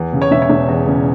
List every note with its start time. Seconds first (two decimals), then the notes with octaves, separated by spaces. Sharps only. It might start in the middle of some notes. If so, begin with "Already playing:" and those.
Already playing: E2
0.13 C#3
0.22 C#5
0.31 E1 E5
0.42 C#5
0.49 E1
0.68 E2
0.86 C#3